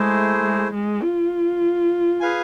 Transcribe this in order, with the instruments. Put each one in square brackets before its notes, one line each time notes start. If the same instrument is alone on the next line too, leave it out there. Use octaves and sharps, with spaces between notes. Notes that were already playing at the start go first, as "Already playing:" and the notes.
Already playing: [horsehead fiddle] G#3 [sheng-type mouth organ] A3 E4 G#4 C5
[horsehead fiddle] G#3
G#3
F4
[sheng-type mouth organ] G#4 B4 F5 G#5